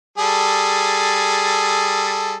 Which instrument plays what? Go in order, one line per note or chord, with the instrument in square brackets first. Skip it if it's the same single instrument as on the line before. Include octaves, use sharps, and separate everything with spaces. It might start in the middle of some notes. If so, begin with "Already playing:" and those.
[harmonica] G3 G#4 A4